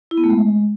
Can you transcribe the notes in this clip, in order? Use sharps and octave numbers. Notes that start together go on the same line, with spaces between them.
E4
B3
A3
G#3